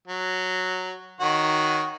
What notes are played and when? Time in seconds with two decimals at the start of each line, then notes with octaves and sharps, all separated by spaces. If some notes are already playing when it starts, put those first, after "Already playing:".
0.08 F#3
1.20 D#3 F#4 C#5